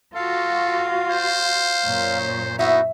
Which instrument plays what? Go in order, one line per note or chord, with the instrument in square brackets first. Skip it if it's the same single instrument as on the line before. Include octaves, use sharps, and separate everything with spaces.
[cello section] F4 F#4 [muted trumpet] A4 [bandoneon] F5
[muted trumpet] C5
[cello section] F#2 A#2 C#5
[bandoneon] B3 E4 F#4 [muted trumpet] D#4 [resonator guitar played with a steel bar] E5